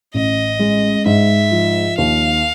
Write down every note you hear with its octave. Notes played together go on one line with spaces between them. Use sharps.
A1 D#5
G#3
G#2 E5
F3
D#2 F5